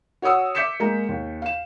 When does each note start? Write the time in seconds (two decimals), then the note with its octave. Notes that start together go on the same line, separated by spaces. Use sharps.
0.22 F#4 C#5 F#5 D#6 E6
0.55 E5 D6 G6 B6 C#7 E7
0.80 G#3 A#3 G#4 A#5
1.09 D#2
1.42 F5 E7